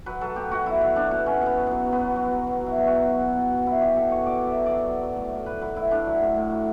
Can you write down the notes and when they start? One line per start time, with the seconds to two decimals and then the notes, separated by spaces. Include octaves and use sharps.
0.06 F#3 B4
0.21 F#3 A4
0.36 B2 G4
0.51 B2 F#4
0.66 F#3 E4
0.81 F#3
0.96 B2 D4
1.11 B2
1.26 B2 C#4
1.41 B2 B3
1.56 F#3
1.67 F#3 B3
1.87 F#3
1.92 B3
2.01 F#3
2.16 F#3
2.31 F#3
2.47 F#3
2.61 B2
2.67 E4
2.76 F#3
2.87 F#3 F#4
3.06 F#3
3.22 B2
3.36 B2
3.52 F#3
3.66 B2 E4
3.81 F#3 G4
3.96 B2 A4
4.11 B2 C#5
4.26 B2 D5
4.41 B2
4.47 E5
4.56 F#3
4.66 D5
4.71 F#3
4.86 F#3
5.02 F#3
5.16 A2
5.32 A2
5.46 F#3 B4
5.61 F#3 B4
5.76 A2 E4
5.91 A2 D4
6.06 F#3
6.21 A2
6.36 A2
6.52 F#3